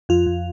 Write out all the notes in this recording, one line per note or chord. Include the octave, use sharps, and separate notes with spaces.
F2 F4
F2